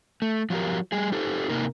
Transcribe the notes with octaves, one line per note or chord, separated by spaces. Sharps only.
A3
F3 F#3 F#4 G4 A#4
G3 G#4
D#4 G4 A4 C5
C3 A#3 D#4 A#4